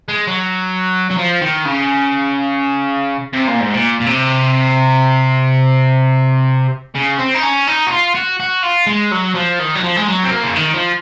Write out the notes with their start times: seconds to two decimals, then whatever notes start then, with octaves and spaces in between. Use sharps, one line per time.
0.08 G#3
0.27 F#3
1.10 F#3
1.17 F3
1.41 D#3
1.65 C#3
3.33 C3
3.48 A#2
3.61 G#2
3.74 A#2
4.00 A#2
4.07 C3
6.95 C#3
7.18 C4
7.34 D#4
7.43 C#4
7.67 D#4
7.87 F#4
7.91 F4
8.15 F#4
8.40 F#4
8.63 F4
8.87 G#3
9.12 F#3
9.35 F3
9.60 D#3
9.75 F#3
9.83 F3
9.96 G#3
10.08 F#3
10.23 C4
10.31 A#3
10.43 C#3
10.56 D#3
10.74 F3